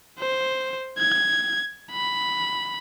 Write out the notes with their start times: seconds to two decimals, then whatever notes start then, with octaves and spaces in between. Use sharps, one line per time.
0.19 C5
0.98 G#6
1.92 B5